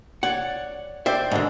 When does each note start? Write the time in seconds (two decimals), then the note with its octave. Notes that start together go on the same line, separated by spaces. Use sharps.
0.23 C#5 D5 F#5
1.06 C5 D5 E5 G5
1.31 G#2 D3